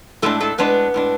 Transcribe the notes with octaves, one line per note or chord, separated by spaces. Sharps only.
A2 G#3 A3 D4 A4
A3 A4
A2 G#3 B3 D4 B4
A2 G#3 D4